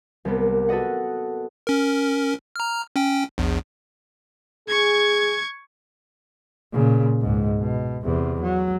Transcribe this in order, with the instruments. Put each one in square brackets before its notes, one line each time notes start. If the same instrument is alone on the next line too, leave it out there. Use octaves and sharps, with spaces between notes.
[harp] C2 A#3 B3
F#4 A4 B4 D#5 F#5
[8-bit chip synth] C#4 A#4
A#5 F6
C#4 G5
A#1 E2
[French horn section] G#4 [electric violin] C#6 G#6
[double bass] A#2 C#3
C#2 G#2
B2
E2 C3
F#3